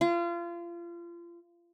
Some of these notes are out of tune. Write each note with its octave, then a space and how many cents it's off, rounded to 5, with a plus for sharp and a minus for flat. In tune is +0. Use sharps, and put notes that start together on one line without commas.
F4 -30